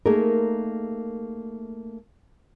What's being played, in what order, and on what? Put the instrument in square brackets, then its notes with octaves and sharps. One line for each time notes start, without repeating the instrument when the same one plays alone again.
[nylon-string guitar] A3 A#3 D#4 G#4 A#4